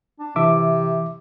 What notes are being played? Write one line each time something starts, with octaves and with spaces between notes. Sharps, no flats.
D4
C3 E3 E5 D6